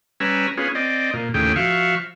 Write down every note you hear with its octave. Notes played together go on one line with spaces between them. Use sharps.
G3 C#4 B4 G#5 A#5 E6
B3 C#4 F4 G#4
C4 D5 D#5
A#2
D#2 A2 C#3 G4 G#4 G5
F3 F#4 E5 F5 C#6